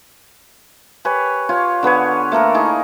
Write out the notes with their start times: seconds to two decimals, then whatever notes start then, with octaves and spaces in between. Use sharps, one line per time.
1.05 G4 B4 C#5 G#5
1.49 F4 C#5
1.83 D3 B3 B4 C#5
2.32 A3 A#3 A4 A#4
2.54 D#4 E4 G#4